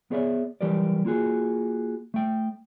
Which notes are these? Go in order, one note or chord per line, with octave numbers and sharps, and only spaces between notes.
B3 G#4 C#5 D5 E5
E3 F#3 G3 G4 A#4 D5
A#3 F4 F#4 G#4
A3 G5